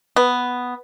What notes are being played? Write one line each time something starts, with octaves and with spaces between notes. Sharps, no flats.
B3